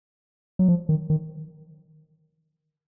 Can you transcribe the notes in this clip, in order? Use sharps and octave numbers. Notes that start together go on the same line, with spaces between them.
F#3
F3
D#3
D#3